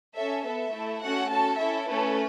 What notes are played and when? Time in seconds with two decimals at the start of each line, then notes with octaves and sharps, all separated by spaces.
0.16 C#4 A4 E5
0.45 B3 A4 E5
0.73 A3 E4 A4
1.02 A3 C#4 F#4 A4 F#5
1.30 C#4 F#4 A4 A5
1.59 C#4 E4 A4 E5
1.88 A3 C#4 A4 B4